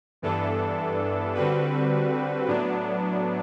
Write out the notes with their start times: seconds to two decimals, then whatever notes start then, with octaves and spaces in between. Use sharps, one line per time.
0.22 G2 E3 B3 D4 A4
1.34 D3 G3 C4 F#4 B4
2.48 A2 F#3 B3 D4